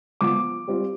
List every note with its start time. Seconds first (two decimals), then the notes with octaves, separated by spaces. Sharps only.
0.21 F3 B3 F4 D6
0.68 G3 C4 F4